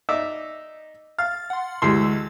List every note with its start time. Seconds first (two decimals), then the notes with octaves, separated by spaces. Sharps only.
0.09 D#4 D5 E5
1.18 F5 A6
1.50 F#5 C6
1.82 D2 E3 G#3 G4 C6 E6